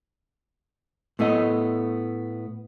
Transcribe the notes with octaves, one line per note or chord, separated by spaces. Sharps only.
A2 A3 B3 D#5